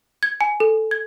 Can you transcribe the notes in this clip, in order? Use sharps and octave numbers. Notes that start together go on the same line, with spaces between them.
G#6
G#5
A4
G#6